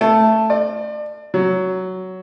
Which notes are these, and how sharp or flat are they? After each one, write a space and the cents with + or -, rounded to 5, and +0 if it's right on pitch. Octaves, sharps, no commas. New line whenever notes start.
A3 +5
D5 +35
F#3 +10